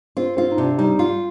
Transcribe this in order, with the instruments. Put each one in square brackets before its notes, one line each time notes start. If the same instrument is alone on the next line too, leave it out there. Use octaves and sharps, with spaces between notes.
[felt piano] C4 [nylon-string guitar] F4
[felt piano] C4 [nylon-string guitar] F4
[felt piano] D#4
[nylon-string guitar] C3 [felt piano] D4
[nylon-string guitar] G3 [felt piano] D#4
[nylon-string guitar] F4